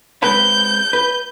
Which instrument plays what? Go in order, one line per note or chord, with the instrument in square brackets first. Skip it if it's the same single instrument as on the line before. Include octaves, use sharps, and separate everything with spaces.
[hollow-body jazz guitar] G#3 C4 B4 [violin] G6
[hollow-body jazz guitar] B4